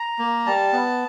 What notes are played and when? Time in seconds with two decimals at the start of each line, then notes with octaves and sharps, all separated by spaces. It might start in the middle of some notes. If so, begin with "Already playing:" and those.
Already playing: A#5
0.19 A#3
0.46 G3 A5
0.73 B3